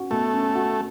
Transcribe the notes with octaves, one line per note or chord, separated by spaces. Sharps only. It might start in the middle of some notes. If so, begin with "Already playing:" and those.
Already playing: C#4 F#4
B2 A3
C#4
F#4